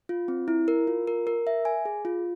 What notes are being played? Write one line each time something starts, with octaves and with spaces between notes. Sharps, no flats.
F4
C4
E4
A#4
F4
A#4
A#4
E5
G#5
G#4
F4